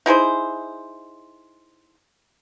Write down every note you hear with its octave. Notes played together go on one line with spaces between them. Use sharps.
D#4 E4 G#4 C5